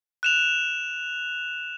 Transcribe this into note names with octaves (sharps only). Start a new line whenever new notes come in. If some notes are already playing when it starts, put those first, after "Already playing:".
F#6 E7 F7